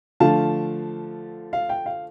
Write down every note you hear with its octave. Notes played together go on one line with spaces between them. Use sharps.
D3 F3 A3 F5 A5
F5
G5
F5